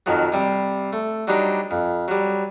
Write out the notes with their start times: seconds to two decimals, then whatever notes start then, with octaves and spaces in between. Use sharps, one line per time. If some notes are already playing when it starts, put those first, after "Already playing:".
0.06 F2 D#3 F3 F#3
0.32 C3 G3 C4
0.93 A3
1.27 F#3 G3 D4 D#4
1.71 F2
2.08 F#3 G3